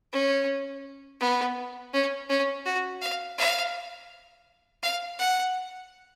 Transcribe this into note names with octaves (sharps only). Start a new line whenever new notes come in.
C#4
B3
C#4
C#4
F#4
F5
F5
F5
F#5